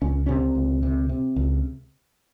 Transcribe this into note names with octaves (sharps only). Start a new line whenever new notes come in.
C#2 C#4
C3 C#4
C#2
C3
C3
C#2